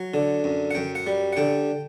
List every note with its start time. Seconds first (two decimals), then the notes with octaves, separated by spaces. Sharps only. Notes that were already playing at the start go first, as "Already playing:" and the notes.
Already playing: F#3
0.14 D3
0.44 F#2
0.71 F#5
0.75 F#2 G5
0.95 F#5
1.07 G3
1.33 F#5
1.37 D3 G5